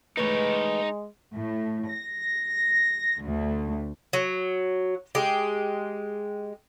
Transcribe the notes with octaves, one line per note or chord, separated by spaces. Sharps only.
E3 G#3 A3 D#4 B4 C#5
A2
A#6
D2
F#3
G#3 G4